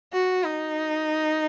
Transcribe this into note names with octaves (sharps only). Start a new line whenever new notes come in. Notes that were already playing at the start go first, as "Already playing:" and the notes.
F#4
D#4